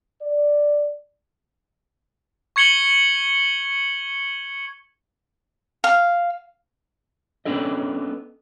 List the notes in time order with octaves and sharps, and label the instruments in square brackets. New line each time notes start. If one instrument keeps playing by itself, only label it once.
[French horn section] D5
[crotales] C#6 G#6 C#7 F#7 G7
[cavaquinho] F5
[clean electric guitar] B3 C#4 D4 A4 D#5